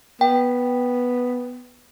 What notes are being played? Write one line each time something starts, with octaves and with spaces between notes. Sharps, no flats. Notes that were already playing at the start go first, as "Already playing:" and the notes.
B3 G5